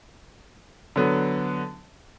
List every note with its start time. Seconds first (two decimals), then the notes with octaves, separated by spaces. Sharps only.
0.96 D3 F#3 B3